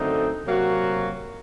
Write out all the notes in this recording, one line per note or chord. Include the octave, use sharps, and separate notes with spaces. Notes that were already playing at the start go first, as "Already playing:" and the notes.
Already playing: F#2 D3 A3 C4 D#4
C3 F#3 A#3 F#4